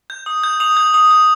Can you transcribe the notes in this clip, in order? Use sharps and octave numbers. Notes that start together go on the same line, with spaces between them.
G6
D#6
G6
D#6 F7
G6
D#6
G6